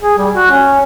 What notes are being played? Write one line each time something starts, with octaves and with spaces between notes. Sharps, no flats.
G#4
G3
F#4
C#4